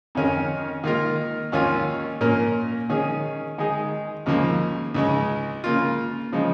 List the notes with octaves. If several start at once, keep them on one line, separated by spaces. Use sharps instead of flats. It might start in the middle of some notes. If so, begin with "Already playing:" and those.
F2 D#3 C#4 A#4
D#3 A#3 F4 A#4
D#2 D#3 C#4 F4
A#2 A#3 C#4 A#4
D#3 C#4 G#4
D#3 G#3 D#4 G#4
D#2 C#3 F3 A#3
C#2 C#3 G#3
C#3 A#3 F4
C#3 F3 G#3 D#4